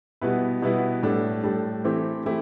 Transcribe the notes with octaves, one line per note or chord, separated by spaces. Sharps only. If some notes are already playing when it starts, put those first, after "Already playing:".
B2 G3 B3 E4 B4
B2 G3 B3 E4 B4
A2 G3 D4 A4
A2 G3 D4 A4
E3 A3 C4 E4 G4
E3 A3 C4 E4 G4